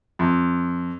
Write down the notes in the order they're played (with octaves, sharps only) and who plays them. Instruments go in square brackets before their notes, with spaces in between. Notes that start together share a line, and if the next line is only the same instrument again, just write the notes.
[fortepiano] F2